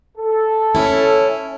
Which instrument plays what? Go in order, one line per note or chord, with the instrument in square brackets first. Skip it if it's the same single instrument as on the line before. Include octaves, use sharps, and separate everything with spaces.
[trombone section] A4
[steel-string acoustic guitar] C#4 E4